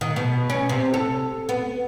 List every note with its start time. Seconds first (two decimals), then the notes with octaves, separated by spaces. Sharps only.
0.01 D#3
0.16 B2
0.50 C#4
0.69 C3
0.94 A4
1.49 B3